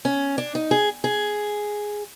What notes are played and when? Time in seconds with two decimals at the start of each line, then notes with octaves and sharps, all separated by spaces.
0.05 C#4
0.38 D4
0.55 D#4
0.71 G#4
1.04 G#4